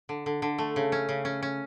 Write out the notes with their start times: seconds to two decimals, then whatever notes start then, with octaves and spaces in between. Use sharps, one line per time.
0.09 D3
0.26 D3
0.42 D3
0.58 A3
0.76 C#3
0.92 C#4
1.09 C#3
1.25 C#4
1.42 C#4